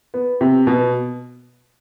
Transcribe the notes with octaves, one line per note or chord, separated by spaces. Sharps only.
B3
C3
B2